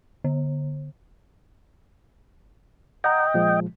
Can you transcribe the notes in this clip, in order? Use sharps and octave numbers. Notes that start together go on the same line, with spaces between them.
D3
D#5 F#5 G5 A#5
A#2 F3 G#3